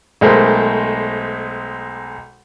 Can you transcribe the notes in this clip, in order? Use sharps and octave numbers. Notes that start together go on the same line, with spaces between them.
B1 G#3 A3 A#4 C5